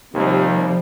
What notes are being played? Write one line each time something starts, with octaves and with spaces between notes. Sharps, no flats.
D#2 C3 F3 G3